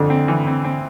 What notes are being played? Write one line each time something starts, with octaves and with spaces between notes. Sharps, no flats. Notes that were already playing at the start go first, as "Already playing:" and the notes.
Already playing: F2 D3 E3
C4
E3
C4
C4